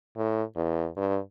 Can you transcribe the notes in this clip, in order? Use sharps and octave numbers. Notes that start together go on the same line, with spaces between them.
A2
E2
G2